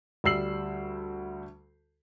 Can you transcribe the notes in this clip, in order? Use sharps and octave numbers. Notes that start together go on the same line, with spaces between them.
D2 G3 E6 C7 F#7